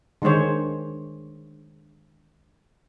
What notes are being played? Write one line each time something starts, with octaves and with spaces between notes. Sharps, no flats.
D3 D#3 G#3 C5 C#5